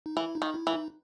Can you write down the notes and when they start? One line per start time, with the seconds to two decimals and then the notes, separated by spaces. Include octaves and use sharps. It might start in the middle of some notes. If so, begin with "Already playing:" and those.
0.06 D#4
0.17 E3 E4
0.35 D#4
0.42 D#3
0.54 E4
0.67 E3
0.74 D#4